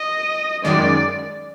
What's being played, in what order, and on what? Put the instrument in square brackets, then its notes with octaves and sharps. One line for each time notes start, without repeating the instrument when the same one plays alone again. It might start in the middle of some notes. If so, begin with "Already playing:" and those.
Already playing: [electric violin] D#5
[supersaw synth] F#2 D#3 G#3 [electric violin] D5